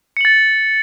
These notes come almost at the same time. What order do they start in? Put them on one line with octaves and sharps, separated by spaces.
C#7 F#7 A6